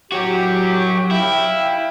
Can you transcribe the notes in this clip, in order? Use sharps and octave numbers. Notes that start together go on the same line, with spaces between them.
F#2 A2 F#3 F#4 G4
E4 E5 F5 G5